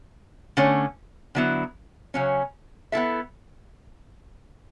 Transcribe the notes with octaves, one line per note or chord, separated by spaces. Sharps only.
D3 A3 C#4
D3 F#3 B3 E4
C#3 F#3 C#4
B3 E4 A4 E5